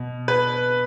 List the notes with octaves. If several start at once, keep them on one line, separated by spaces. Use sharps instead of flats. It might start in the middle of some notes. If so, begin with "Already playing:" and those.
Already playing: B2
B4